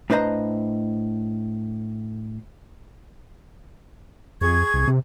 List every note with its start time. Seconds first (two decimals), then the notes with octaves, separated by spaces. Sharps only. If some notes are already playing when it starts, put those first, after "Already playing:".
0.10 A2 D4 B4 C5 D#5 A#5
4.41 F2 G#4 C#6 G#6
4.74 C2
4.88 C3